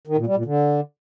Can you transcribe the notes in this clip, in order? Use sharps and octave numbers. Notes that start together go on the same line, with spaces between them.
D#3
A#2
G3
A#2
D3